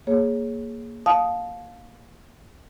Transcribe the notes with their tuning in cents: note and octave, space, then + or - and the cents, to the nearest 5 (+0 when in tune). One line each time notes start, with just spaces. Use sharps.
A#3 +0 G#4 +0 C#5 +0
F5 +20 A5 -20 D#6 +0